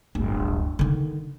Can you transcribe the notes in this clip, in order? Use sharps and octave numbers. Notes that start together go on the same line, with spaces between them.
D1 G1
D3 D#3